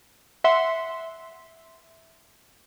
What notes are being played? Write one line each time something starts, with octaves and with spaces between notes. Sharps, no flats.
E5 F#5 C6